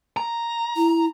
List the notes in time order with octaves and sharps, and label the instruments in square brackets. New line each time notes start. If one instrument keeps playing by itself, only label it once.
[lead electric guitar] A#5
[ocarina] E4